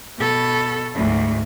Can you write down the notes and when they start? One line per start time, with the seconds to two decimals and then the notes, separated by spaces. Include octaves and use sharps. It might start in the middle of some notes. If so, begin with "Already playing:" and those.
0.19 B2 A4
0.95 D2 G#2